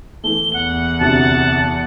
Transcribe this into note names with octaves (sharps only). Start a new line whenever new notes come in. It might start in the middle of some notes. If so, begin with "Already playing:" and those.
E3 A3 G7
E2 F#5
D2 C3 A5